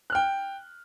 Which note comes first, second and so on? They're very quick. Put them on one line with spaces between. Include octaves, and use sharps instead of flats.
F#6 F6 G5